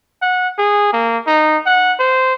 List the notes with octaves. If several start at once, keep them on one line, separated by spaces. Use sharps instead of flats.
F#5
G#4
A#3
D#4
F#5
C5